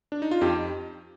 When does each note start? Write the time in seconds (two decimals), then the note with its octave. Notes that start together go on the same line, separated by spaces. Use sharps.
0.12 D4
0.22 D#4
0.31 F4
0.41 F2 D#4 G4